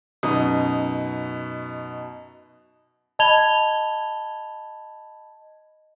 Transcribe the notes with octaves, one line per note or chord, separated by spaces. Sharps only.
F#2 B2 D#4 D#6
D#5 A5 B5 G#6 F7 G7